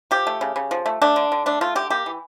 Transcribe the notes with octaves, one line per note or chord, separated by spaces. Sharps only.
F3 G4
A3
C#3
C#3
F3
A3
A3 D4
D3
D3
A3 D4
A3 F4
D3 G4
A#3 G4
E3